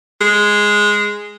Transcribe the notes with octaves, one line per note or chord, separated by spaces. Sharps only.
G#3